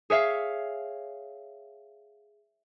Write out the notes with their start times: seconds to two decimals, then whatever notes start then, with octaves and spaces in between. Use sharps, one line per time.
0.10 G#4 C#5 E5 F5